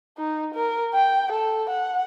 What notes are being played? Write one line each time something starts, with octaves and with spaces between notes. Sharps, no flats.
D#4
A#4
G5
A4
F#5